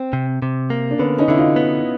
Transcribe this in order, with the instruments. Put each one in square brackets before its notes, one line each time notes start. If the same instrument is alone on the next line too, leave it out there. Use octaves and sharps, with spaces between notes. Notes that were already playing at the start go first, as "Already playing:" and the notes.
Already playing: [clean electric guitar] C4
C3
C3
A#3
[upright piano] D4
[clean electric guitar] D3 [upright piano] B3 C#4
[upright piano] C#4 D#4
[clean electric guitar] D3 [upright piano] E4
[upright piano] D#4 F4
[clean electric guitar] B3